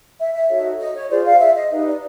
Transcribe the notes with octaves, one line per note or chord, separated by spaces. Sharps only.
E5
E5
D#4 F#4 A4 C#5
D#5
C#5
F4 G#4 C5 D5
F5
E5
D#5
D#4 G4 B4
D5